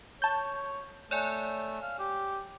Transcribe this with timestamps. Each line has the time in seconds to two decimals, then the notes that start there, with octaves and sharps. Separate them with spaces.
0.22 C#5 A5 G6
1.11 A3 C#5 D5 G#5
1.82 F5
1.99 G4